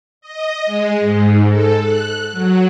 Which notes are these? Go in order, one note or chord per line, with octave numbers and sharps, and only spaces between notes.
D#5
G#3
G#2
A4
F#6
F#3